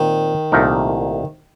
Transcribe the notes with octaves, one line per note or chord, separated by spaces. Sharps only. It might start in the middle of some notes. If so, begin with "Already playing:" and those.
Already playing: A#2 D#3 C4
C2 A#2 A3 D#4 A#4